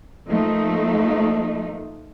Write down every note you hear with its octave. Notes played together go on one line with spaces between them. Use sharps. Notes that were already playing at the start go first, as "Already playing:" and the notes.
F3 A3 A#3 D#4